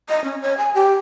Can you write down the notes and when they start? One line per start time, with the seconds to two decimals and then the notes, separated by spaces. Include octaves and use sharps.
0.09 D#5
0.24 C#4
0.42 C#5
0.57 G#5
0.74 G4